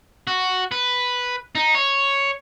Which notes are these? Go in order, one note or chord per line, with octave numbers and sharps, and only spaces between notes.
F#4
B4
D#4
C#5